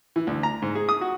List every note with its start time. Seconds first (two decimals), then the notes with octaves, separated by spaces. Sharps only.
0.16 E3
0.27 D2
0.43 A#5
0.62 G#2
0.75 G#4
0.89 D#6
1.01 F#4